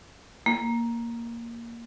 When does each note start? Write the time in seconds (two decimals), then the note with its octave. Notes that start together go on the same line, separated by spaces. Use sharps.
0.46 A#3